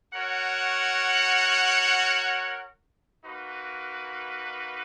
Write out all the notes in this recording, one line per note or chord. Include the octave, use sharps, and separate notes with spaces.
F#4 A#4 C#5 F#5
A#3 D#4 F#4 B4